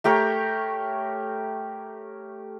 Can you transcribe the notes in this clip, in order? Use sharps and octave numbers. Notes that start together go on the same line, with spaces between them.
A3 G4 A#4 C#5